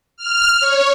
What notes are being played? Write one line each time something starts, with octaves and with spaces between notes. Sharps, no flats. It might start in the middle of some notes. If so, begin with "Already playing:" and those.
F6
C#5